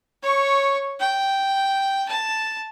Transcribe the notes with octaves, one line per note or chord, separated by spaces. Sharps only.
C#5 C#6
G5
A5